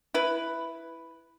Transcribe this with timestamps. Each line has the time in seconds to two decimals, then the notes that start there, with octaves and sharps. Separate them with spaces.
0.14 E4 B4